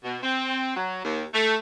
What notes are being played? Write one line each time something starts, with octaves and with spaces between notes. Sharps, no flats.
B2
C4
F#3
D#2
A3